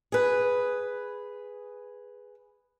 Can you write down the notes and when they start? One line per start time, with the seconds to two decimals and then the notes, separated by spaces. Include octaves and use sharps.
0.12 G#4 B4